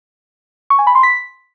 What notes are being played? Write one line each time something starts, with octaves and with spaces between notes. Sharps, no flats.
C#6
G#5
B5
C6
B6